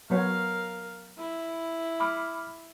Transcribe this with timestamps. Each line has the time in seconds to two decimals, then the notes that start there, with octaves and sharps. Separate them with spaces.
0.10 F#3 B3 A#4 C#5 F5
1.17 E4
2.00 B5 D6 F6